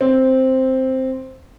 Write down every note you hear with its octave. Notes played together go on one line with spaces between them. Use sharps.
C4